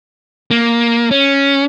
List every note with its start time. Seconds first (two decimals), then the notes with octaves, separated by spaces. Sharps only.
0.51 A#3
1.11 C#4